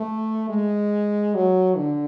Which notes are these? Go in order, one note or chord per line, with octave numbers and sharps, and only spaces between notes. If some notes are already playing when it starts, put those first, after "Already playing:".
Already playing: A3
G#3
F#3
D3